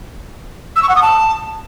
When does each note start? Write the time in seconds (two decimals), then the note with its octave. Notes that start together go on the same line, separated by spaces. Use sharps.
0.76 E6
0.83 C#6
0.89 F#5
0.96 D#6
1.02 A5